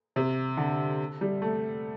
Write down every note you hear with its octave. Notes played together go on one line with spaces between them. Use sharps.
C3
D3
G3
A3